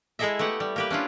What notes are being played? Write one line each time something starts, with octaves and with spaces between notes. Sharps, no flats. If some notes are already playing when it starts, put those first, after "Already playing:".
G#3 E4 G#4 A4 D#5 E5
A3 B3 G4 F#5
G3
A#3 G4 B4
C#4 D4 E4 F4